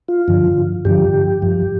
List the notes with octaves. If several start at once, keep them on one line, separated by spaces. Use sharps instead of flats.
F4
G2 D3 F3
G2 D3 F3 G4
G2 F3